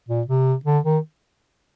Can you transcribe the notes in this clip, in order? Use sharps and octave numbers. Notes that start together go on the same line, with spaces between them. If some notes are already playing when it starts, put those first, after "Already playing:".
A#2
C3
D3
D#3